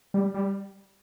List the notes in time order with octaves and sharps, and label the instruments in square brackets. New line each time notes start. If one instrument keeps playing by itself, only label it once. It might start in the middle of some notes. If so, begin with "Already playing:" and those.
[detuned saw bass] G3
G3